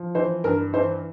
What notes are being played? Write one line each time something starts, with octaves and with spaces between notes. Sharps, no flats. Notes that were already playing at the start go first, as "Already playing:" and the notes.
Already playing: F3
E3 C5
G2 A#4
E3 C5